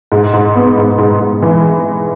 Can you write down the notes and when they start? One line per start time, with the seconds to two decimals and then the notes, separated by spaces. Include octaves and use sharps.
0.12 G#2
0.33 G#2
0.56 B3
0.78 G#2
0.98 G#2
1.20 G#2
1.42 E3